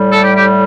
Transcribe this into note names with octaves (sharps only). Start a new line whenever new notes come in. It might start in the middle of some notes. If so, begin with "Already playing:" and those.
Already playing: A2 G3
A4
G4
G4